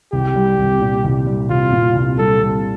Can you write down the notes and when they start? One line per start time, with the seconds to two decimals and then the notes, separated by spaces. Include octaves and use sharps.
0.13 C2 G4
0.36 G3
0.58 C2
0.81 A#2
1.04 C2
1.27 G3
1.50 C2 F4
1.72 A#2
1.95 C2
2.18 G3 A4
2.41 C2